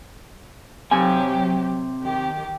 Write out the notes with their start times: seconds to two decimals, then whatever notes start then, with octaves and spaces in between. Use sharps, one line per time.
0.91 C3 F#3 G4 G#5
2.02 D#3 G4